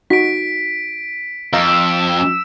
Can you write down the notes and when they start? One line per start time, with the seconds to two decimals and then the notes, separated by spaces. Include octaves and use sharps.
0.10 D#4 F#4 B6 D7
1.53 F2 D#5 F5 A#5 E6